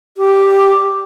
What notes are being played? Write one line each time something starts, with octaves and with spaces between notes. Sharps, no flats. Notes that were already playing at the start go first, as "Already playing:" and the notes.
G4